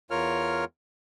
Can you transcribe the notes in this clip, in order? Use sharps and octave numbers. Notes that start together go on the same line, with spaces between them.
E2 F4 A#4 C#5 F6